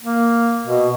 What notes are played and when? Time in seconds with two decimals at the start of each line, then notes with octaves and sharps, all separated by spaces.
0.03 A#3
0.67 B2